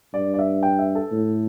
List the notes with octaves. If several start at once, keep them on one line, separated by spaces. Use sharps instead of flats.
G2 D5
D5
E5
G5
E5
A4
A2